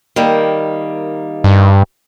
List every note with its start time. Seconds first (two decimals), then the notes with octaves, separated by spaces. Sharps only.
0.16 D#3 G3 A#3
1.44 G2